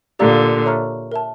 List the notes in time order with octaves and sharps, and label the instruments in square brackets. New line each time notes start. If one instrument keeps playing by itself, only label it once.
[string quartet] A#2 D3 [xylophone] G4 D5 F5 A#5 E6
[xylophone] C#5 E5 A#5 C#6 F6
A#4 E5 A5